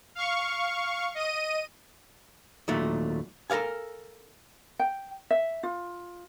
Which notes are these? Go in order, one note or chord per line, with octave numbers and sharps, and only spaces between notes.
F5 C#6
D#5 D#7
D#2 A#2 F#3 A3
A4 A#4 D5 F5 G#5
G5
E5
F4